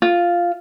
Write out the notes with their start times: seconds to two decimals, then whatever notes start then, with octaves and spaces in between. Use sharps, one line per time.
0.02 F4